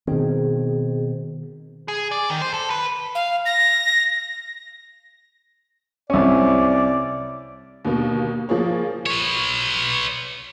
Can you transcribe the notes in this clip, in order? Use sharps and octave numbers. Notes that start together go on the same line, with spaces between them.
B2 D#3 C4 G#4 C5
G#4
D5
D#3
C5
A4
B4
F5
A#6
C2 C#4 D5
D#2 B2 D3 A#3
F3 A#3 G#4 C#5
B4 C#5